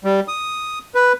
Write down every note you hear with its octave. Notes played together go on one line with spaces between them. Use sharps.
G3
D#6
B4